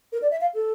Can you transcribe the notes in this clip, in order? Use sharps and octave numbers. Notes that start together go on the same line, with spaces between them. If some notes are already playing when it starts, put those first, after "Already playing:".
A#4
D5
E5
F5
A4